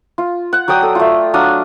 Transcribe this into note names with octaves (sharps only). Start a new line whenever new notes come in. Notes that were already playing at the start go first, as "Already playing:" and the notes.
F4
F#5
F#3 D5 G5 D#6
A4
A3 F4
F#3 D4 F5 D#6